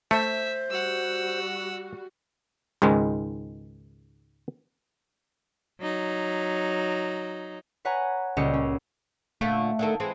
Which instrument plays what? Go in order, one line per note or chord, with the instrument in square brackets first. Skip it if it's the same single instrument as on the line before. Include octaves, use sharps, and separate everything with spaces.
[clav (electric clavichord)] A3 [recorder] C5 [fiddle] E5
[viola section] G3 F#4 [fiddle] F#5 E6
[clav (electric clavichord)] C#2 G#2 D#3 G#3
[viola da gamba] F#3 D#4
[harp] B4 C#5 F#5 G#5 A#5
C#2 A#2 G3 G4 D#5 C#7
C#4
[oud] A#2 D3 F4 [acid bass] A3
[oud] D3 D#3 A4
E3 G#3 C4